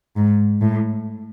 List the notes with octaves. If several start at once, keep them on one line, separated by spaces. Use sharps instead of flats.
G#2
A2